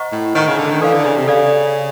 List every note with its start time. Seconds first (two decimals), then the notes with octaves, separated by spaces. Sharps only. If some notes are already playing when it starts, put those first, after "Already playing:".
Already playing: C5 D#5 F#5 A#5 C#6
0.12 A2
0.35 D#3 C5 D#5 F#5 A#5 C#6
0.47 C#3
0.58 D3
0.70 D#3
0.81 E3 A4 D5 F5
0.93 D3
1.05 C#3
1.16 C3
1.28 C#3 A4 D5 F5